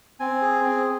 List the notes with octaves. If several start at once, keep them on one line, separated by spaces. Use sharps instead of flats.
C4 G#5
G#4
C4